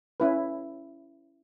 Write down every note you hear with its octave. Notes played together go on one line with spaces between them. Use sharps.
C#4 E4 B4